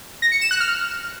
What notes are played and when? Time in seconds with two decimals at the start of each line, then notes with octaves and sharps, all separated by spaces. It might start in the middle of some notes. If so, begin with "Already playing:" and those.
0.22 A#6
0.32 C#7
0.41 E7
0.51 F#6
0.60 F6